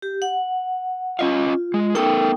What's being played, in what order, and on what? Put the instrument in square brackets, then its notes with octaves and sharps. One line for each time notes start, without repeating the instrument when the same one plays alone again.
[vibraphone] G4
F#5
[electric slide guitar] C#4 D#5 F5 [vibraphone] F4
[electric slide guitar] G#3
[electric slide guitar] B3 A4 A#4 [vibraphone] D#4 G5 C#6